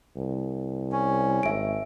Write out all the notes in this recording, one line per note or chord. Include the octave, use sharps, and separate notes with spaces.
C2
C#4
G#1 E5 D7